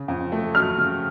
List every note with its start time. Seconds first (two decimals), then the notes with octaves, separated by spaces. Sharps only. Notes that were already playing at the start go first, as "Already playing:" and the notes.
Already playing: C#3
0.08 F2
0.32 A3
0.55 F#3 F6
0.78 C#3